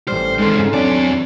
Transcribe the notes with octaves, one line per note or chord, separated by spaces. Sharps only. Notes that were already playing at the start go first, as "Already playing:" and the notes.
A1 G3 C5 F6
G#3 C4 D#4 A4 C6
G#2 C#3
E2 F#3 C4 D4 C#5 D5 G#5